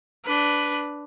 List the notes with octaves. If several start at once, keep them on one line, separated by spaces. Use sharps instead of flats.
D4 B4